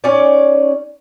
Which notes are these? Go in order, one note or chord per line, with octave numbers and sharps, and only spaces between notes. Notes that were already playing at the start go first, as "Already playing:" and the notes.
C#4 D#4 G#4 D5